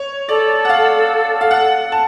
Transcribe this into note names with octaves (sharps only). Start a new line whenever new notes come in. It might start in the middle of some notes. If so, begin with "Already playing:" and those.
Already playing: C#5
A4 D5
F#5
F5
F5
F#5
A5